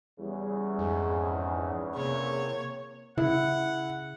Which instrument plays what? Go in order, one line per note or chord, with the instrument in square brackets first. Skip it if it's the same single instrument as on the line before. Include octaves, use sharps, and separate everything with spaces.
[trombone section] E2 C#3 [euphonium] G3
[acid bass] F2 [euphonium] G#2
[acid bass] C3 [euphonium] A#3 [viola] C#5
[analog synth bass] C#3 [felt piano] E4 [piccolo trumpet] F#5